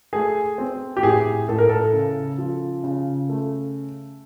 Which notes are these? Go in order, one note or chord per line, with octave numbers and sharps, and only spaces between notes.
A3 G#4
C4
G4
A2 G#4
A2 A4
A#4
A4
C#3
F3
C#3
A3